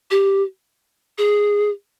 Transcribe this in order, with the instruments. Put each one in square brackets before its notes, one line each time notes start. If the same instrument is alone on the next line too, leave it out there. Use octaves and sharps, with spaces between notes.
[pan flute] G4
G#4